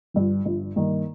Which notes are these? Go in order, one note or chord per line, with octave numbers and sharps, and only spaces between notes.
G1 G2 F3
G1 G2 F3
G2 D#3 A#3